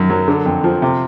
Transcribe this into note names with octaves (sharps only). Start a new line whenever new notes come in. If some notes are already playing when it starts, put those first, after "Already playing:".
Already playing: F#2 D#3
F#3
D3
F2
F3
C3